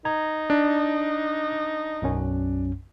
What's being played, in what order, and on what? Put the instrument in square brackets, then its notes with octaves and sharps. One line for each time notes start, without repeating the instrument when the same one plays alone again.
[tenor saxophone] D#4 [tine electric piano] A#5 G#6
[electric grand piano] D4
[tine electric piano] B1 F#2 C#4